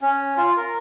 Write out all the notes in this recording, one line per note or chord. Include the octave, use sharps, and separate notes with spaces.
C#4
F4
A#4